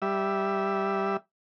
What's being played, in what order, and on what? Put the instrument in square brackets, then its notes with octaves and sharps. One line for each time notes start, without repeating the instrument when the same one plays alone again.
[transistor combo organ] G3 E5